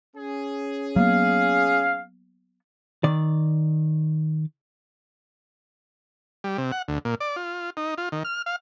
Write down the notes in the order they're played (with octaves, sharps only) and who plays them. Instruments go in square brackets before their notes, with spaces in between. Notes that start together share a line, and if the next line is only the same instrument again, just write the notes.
[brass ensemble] C#4 G#4
[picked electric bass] F#3 A#3 B3 [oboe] F5
[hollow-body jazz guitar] D#3 D5
[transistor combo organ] G3
C3
F#5
D2
A#2
D5
F4
D#4
F4
D#3
F6
F5